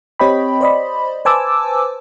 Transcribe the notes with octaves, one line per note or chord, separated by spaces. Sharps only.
C4 G4 C#5 D#5 G5 B5
C5 D5 D#5 B5
B4 C5 G#5 A5 D6 E6